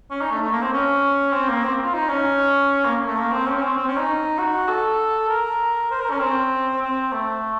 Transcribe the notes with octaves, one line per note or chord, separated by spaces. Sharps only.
C#4
D#4
A3
A3
A#3
C4
C#4
C4
A#3
C4
F4
D#4
C#4
A#3
A3
A#3
C4
C#4
C#4
C4
C4
C#4
D#4
F#4
A4
A#4
C5
A#4
C#4
C4
C4
A3